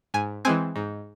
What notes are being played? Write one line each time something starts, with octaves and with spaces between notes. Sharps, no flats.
G#2 G#5
E3 G#3 C4 G#5
G#2